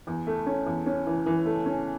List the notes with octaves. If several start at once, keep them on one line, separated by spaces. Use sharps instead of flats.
E2
A3
C#4
E2
C#4
E3
E3
A3
C#4